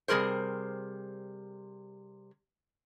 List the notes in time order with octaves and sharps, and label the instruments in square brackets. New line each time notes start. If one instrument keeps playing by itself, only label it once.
[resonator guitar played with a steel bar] C3 G3 G#4 A#4 C5